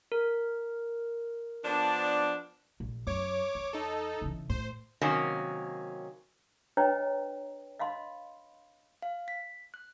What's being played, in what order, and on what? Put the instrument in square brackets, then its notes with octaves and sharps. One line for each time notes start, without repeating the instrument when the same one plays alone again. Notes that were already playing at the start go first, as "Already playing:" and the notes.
[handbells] A#4
[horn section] F3 B3 D4
[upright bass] A#1
[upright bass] F#2 [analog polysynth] C#5 D6
[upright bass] E2
[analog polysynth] D#4 A4
[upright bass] C#3 E3
[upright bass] A2 [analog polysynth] C5
[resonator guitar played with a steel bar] C3 D#3 F#3 A#3 C#4
[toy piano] D4 B4 C#5 D#5 G5 A#5
D#5 F5 B5 C6
[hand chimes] F5
B6
F#6